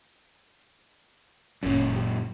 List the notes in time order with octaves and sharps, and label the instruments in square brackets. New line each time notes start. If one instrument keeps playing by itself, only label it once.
[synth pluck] G1 C#4 [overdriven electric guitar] F#2 A#2
[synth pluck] G4